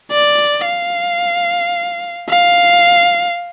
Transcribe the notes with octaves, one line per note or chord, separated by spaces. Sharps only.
D5
F5
F5